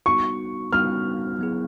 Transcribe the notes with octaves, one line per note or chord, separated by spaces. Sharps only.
G3 B3 D#4 F#4 C#6
G3 B3 D#4 F#4 F6
F#3 B3 E4 G#4